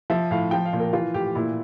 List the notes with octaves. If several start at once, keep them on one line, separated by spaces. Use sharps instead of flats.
F3 E5
A2 F5
F3 G5
F5
A#2
A#4
E3 F4
A2 G4
A#2 E4